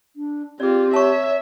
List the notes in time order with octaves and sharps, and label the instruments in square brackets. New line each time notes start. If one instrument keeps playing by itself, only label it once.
[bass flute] D4
[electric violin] C4 F4 [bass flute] G4 [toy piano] G#4 D5
[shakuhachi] C#5 [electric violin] E5 [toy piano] A5 C#6